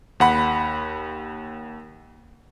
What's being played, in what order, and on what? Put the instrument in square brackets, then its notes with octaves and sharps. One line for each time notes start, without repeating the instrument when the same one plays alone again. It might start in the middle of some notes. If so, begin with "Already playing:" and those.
[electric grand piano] D#2 F#5 B5